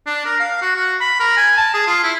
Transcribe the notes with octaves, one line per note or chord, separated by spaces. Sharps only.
D4
A#4
F5
F#4
F#4
B5
A#4
G#5
A5
G#4
F4
E4